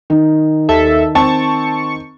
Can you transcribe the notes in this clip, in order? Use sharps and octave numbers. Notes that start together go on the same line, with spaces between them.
D#3
D#2 A4 E5
C4 A5 C#6